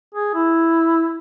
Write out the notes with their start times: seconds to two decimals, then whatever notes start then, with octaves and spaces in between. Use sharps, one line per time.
0.15 G#4
0.34 E4